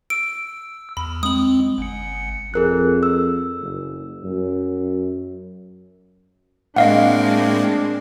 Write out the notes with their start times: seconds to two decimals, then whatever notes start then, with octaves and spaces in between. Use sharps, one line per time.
0.10 E6 D7
0.97 E2 B5
1.23 G#3 C4 D#6 F#7
1.78 G1 C#7
2.54 F2 G#4 A#4 F#6
3.03 E6
3.60 F#1
4.24 F#2
6.76 A2 G#3 A#3 C4 D4 D#5 F5 F#5